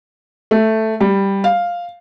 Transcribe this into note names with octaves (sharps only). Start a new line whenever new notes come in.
A3
G3
F5